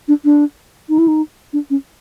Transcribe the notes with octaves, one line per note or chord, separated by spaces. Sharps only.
D4
D4
D#4
E4
D#4
D4
C#4